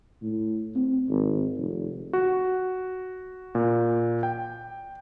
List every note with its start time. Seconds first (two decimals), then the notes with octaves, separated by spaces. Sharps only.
0.22 A2
0.76 C4
1.09 G#1
1.57 F1
2.13 F#4
3.55 A#2
4.23 G5